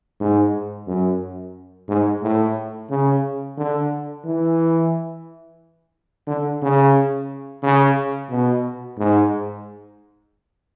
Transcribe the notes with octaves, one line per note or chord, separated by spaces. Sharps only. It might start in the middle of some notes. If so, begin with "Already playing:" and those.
G#2
F#2
G#2
A2
C#3
D3
E3
D3
C#3
C#3
B2
G#2